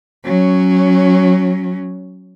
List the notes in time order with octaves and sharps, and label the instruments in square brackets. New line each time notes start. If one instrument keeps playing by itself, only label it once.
[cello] F#3 C#4